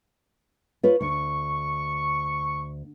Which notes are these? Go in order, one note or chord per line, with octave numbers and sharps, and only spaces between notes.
F4 B4 C#5
D2 C#6